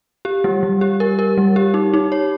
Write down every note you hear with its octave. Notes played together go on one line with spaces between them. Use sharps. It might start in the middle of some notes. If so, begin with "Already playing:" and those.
G4
G3
G3
G4
A#4
A#4
G3
G4
D#4
D#4
C#5